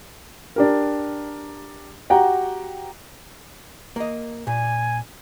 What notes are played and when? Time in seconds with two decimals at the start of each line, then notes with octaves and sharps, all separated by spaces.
0.56 D4 G4 A#4
2.10 F#4 G4 F#5 G5 A#5
3.96 A#3 D#5
4.47 A#2 G#5